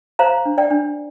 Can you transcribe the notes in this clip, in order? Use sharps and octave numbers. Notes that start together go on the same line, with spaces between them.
C5 F5 A#5
D4
D5 G5
D4